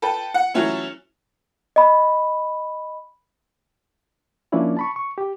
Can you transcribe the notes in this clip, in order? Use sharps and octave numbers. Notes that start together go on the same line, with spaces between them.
A4 B4 G5
F#5
E3 F#3 A3 C#4 E4
D#5 B5
F3 A#3 C#4 D4 E4 D5
A5 B5 C#6
C#6
G4